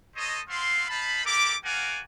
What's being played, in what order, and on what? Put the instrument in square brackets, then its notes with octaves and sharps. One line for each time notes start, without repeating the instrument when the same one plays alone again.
[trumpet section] A4 C5 C#5 D#5
B3 C4 F5 C6
D#4 F5 A5 B5
E4 G4 A4 A#4 D6
F#4 A#4 D5 F5 F#5 G#5